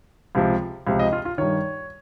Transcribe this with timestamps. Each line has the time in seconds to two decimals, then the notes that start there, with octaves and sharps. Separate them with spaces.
0.35 C#2 C3 F3
0.87 C#2 C3 F3
0.99 D#5
1.12 F4
1.25 F4
1.38 G2 D#3 C#5